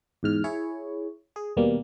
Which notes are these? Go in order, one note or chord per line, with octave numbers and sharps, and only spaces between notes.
E2 G#2 F6
E4 G#4 C#5
G#4
D#2 B2 G3 A#3